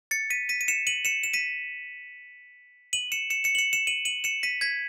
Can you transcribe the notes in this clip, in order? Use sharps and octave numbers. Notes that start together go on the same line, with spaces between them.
A6 C#7
B6 D#7
B6 D#7
D#7
C#7 E7
D#7 F#7
C#7 E7
E7
B6 D#7
D#7 F#7
C#7 E7
C#7 E7
C#7 E7
F#7
C#7 E7
C#7 E7
D#7 F#7
D#7 F#7
C#7 E7
B6 D#7
G#6 B6